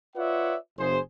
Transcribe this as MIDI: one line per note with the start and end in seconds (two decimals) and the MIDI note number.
0.16 0.55 65
0.16 0.55 71
0.16 0.55 73
0.16 0.55 74
0.16 0.55 76
0.16 0.55 78
0.78 0.99 30
0.78 0.99 68
0.78 0.99 72